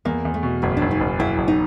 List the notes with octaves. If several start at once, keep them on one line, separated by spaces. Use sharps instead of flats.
E2 A#3
E2
A3
B2
F#1 A3
F#1 D4
D#4
F#1
F#1 E4
F#1
D#4